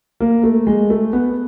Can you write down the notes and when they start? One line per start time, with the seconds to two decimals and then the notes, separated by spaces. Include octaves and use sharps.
0.20 A#3
0.44 A3
0.67 G#3
0.90 A3
1.13 B3